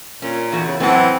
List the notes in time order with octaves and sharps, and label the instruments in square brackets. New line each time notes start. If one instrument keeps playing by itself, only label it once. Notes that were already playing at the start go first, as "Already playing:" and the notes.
[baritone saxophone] A#2 [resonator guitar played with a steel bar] C#4
[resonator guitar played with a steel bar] E2 A3 F#4
[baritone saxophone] C#3
[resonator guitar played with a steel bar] F#2 A2 F#5 [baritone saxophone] E3 [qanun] C4 A5